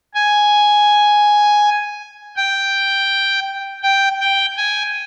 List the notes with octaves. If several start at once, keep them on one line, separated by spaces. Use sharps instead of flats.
G#5
G5
G5
G5
G#5